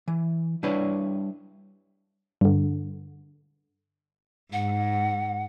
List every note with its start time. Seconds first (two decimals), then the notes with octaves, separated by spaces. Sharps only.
0.08 E3
0.63 G3 D4 E4 B4 C#5
2.41 G2 D3
4.53 G#2 F#5